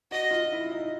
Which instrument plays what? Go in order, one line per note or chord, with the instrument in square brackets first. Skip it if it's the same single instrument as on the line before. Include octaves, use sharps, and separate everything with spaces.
[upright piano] F#4 [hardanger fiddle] D#5
[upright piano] F4
E4
D#4